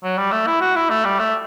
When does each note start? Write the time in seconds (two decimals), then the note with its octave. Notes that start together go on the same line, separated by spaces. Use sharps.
0.04 F#3
0.18 G3
0.32 A3
0.47 E4
0.61 F#4
0.76 E4
0.90 A3
1.05 G3
1.19 A3